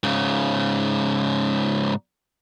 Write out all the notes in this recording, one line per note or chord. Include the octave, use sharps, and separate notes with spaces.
G#2 C#3